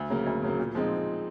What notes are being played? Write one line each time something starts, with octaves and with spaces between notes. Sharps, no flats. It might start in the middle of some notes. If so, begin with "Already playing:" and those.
Already playing: D2
C#3 F#3 A#3
D2
C#3 F#3 A#3
A#2
F3 G#3 C4 D#4